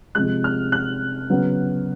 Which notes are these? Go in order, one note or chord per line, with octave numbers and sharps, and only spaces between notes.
C3 F3 G#3 F#6
F6
F#6
C#3 F#3 B3